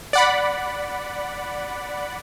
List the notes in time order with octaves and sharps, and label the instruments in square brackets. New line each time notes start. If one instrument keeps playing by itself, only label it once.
[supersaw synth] D5 F#5 B5